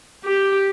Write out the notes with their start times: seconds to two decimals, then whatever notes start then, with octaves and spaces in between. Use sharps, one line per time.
0.24 G4